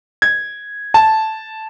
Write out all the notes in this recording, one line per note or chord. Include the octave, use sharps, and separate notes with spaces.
G#6
A5